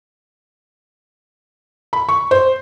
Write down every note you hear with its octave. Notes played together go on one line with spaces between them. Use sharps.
B5
C#6
C5